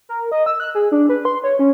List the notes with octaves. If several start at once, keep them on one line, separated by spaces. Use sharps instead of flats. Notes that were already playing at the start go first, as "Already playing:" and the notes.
A#4
D#5
E6
F#6
G#4
D4
B4
C6
C#5
C#4